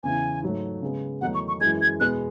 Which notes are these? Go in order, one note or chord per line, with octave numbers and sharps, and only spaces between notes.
E2 C#3 E3 G#5
G#2 F#3 A3
C#3 G#3 B3
E2 D#3 F#3 A3 D#4 F#5
C#6
C#6
F#2 E3 G#3 G#6
G#6
E2 B2 G#3 B3 F#6